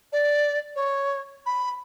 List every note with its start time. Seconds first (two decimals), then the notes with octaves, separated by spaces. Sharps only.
0.12 D5
0.75 C#5
1.45 B5